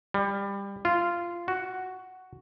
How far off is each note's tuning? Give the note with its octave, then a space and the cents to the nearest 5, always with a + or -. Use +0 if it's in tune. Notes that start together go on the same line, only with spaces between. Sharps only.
G3 +25
F4 -15
F#4 +5